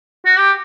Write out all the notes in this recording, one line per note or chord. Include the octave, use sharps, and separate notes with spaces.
F#4
G4